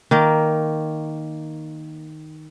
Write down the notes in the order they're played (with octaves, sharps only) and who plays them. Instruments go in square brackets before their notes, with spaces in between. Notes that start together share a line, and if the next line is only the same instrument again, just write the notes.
[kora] D#3 A#3